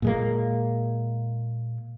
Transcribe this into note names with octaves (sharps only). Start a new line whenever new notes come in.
A#2 G#3 A#3